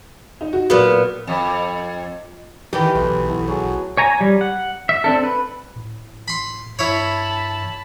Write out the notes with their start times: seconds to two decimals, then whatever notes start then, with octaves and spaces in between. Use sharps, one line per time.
0.41 D#4
0.53 F#4
0.70 A#2 F#3 B3
1.27 F2
2.73 D#3 E3 G4 D#5
2.95 B1 A3 C6
3.28 A3 B3 E4
3.48 F#3 G#4 A5
3.97 C#5 G#5 A#5
4.21 G3
4.41 F#5
4.89 E5
5.04 C4 D4 A4
5.24 B4
5.76 A2
6.28 B5 C6
6.79 G2 E4 C#5 A5 B5